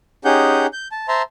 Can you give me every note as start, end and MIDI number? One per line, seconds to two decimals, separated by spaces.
0.25 0.67 61
0.25 0.67 63
0.25 0.67 67
0.25 0.67 68
0.25 0.67 78
0.25 0.67 91
0.73 0.88 91
0.92 1.07 81
1.08 1.22 72
1.08 1.22 76
1.08 1.22 81
1.08 1.22 82
1.08 1.22 84